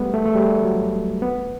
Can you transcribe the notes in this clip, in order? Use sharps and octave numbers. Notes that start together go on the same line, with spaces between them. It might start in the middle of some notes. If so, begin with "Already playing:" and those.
Already playing: G3 A3 B3
A3
A3
G3
F#3
B3